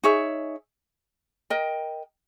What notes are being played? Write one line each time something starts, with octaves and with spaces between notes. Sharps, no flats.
D#4 G#4 C#5 E5
A#4 D#5 G5